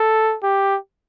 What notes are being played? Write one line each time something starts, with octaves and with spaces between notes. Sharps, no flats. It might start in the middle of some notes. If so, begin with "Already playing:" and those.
Already playing: A4
G4